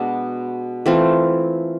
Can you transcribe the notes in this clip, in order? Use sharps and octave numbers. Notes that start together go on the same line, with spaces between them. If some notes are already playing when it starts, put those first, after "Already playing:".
Already playing: B2 G#3 B3 D4
E3 A3 C4 F4